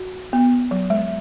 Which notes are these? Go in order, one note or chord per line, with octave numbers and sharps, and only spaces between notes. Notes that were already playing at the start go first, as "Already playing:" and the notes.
Already playing: F#4
B3
F#3
G#3